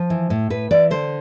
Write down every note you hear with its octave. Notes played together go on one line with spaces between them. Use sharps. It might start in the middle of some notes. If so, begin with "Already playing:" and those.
Already playing: F3
E3
A2
A2 B4
E3 D5
D3 C5